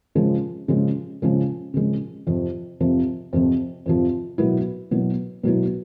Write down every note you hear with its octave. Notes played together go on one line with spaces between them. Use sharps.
C#3 F3 G#3
C#3 F3 G#3
C#3 F3 G#3
C#3 F3 G#3
F2 C3 F3
F2 C3 F3
F2 C3 F3
F2 C3 F3
B2 F#3 B3 E4
B2 F#3 B3 E4
B2 F#3 B3 E4